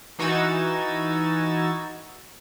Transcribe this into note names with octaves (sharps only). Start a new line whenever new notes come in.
E3 D#4 F#4 E6 G#6 A6